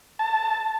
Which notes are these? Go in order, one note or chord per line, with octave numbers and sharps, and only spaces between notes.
A5